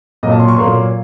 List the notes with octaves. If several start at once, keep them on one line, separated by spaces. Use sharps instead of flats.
A#2 F#3 A#3 D#5
A5
C6
C#6
A#2 F#3 A#3 C6